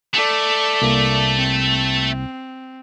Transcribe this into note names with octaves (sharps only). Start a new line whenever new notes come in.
A3 A4 D5
C2 A#3
C4